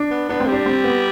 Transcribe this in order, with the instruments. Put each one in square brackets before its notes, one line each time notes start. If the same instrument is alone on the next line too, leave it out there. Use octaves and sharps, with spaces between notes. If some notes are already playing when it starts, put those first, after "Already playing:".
Already playing: [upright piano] D4
[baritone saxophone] B3
[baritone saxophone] B3 [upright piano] D4
[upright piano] C4
[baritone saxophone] G3
[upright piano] D4
C4
B3